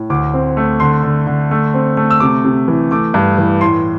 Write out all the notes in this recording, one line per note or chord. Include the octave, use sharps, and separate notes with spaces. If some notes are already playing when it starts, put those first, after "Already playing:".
Already playing: A2
D2 D6
C4
A3
D3 C6
D3
D3
A3
C4
A3
E6
C3 D6
C3
E3
A3 D6
G2
E3
A2 C6